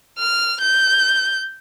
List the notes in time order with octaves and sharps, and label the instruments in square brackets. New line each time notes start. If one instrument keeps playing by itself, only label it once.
[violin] F6
G6